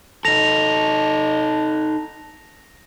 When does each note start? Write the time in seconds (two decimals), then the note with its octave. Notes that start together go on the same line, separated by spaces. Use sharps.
0.25 D#4 A4 A#6 F7